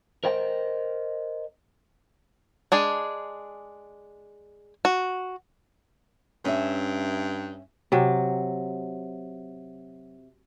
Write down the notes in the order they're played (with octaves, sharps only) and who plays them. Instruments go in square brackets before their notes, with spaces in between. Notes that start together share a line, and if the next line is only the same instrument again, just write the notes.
[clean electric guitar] A#4 C5 D#5 G5
[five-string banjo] G#3 D4 G#4
F#4
[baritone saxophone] G2 [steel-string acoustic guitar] C#4 E5
[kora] C3 F#3